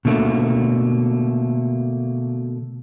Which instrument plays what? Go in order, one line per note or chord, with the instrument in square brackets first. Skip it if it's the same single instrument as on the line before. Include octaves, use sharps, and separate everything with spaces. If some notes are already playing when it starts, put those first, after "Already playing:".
[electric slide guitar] B2 D3 A3 A#3